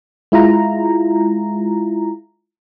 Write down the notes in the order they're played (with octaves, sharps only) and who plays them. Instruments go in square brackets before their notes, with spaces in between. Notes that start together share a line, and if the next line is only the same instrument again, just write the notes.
[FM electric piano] G#3 E4 F4 A#5